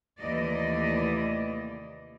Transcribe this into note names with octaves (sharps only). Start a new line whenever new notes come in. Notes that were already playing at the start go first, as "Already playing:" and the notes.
D#2 C3 E3 A3 D5 D#5